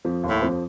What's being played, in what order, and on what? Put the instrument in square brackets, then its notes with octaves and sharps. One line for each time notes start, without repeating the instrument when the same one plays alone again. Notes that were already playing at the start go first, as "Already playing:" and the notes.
[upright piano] F2 F3
D#2 D#3
[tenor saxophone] A2
[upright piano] F2 F3